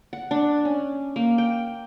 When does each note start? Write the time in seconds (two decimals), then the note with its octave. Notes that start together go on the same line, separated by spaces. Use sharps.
0.13 F#5
0.31 D4
0.65 C#4
1.16 A#3
1.38 G5